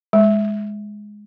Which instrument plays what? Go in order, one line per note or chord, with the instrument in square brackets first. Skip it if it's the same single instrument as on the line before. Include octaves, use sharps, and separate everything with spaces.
[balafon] G#3